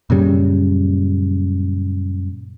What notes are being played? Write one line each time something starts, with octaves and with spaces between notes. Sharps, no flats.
F#2 A#2 C#3 G3